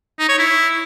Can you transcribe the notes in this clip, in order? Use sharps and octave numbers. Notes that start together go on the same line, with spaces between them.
D#4
C#5
E4